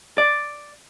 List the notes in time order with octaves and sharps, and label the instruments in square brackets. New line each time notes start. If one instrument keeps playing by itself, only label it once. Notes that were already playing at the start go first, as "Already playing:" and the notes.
[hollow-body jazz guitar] D5